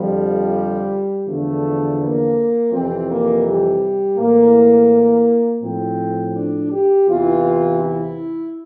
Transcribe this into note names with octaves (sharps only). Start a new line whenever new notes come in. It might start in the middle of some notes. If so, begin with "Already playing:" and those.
Already playing: F2 D3 F3 G3
E2 D3 F3 A3
A#3
F2 C3 E3 C4
A#3
G3
A2 E3 A#3
A2 F3 C4
D4
G4
E2 C3 E3 F4
E4